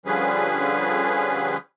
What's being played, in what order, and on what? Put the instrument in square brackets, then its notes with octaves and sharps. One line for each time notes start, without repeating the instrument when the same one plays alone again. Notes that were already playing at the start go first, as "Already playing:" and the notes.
[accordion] D3 F3 G3 C#4 G#4 B4